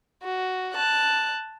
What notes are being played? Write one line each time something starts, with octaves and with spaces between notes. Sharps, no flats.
F#4
A5 F#6